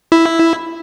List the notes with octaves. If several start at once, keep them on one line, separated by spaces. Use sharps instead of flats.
E4